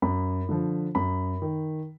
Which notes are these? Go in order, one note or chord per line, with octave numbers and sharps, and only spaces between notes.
F#2 B5
D3 F3
F#2 B5
D#3